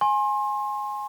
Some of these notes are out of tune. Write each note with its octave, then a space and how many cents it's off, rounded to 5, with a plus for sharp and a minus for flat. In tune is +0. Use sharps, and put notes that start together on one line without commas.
G#5 +0 C6 +35